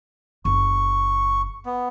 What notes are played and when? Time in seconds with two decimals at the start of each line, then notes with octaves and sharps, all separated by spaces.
0.45 F#1 C#6
1.65 B3